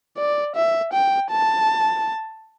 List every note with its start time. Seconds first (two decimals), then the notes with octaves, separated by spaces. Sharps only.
0.17 D5
0.55 E5
0.93 G5
1.31 A5